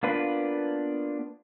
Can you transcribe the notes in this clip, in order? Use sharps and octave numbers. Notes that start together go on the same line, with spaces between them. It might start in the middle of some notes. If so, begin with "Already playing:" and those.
A#3 B3 D4 F4 B4